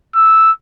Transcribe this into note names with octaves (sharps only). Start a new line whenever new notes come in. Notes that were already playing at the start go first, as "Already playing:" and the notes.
E6